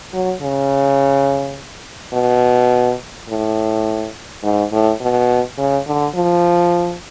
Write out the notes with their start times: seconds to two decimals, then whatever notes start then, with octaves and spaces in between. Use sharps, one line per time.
0.13 F#3
0.42 C#3
2.13 B2
3.29 A2
4.43 G#2
4.72 A2
5.01 B2
5.58 C#3
5.87 D3
6.15 F3